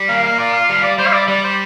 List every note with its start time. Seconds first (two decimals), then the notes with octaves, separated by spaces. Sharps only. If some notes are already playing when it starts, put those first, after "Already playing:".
Already playing: G3
0.09 A#3 F5
0.24 F5
0.38 F4 D5
0.53 F5
0.69 G3 F5
0.83 D5
0.99 G3 C5
1.07 F5
1.13 D5
1.28 G3 D5
1.44 C5